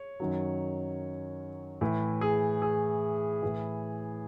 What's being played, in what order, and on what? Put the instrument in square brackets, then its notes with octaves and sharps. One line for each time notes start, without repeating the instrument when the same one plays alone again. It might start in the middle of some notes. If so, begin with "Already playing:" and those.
Already playing: [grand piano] C#5
F#2 D#3 F#3
A2 E3
G#4
G#4
A2 E3